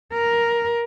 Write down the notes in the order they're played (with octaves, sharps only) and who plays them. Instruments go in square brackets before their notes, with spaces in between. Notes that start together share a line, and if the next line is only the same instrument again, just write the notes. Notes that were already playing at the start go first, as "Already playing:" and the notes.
[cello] A#4